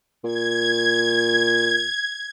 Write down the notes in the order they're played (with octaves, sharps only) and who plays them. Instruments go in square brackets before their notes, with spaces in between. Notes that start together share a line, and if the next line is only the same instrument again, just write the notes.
[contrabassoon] A#2 [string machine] G#6